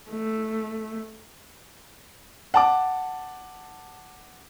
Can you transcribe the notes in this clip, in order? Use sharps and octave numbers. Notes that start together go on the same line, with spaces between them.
A3
F#5 A5 D6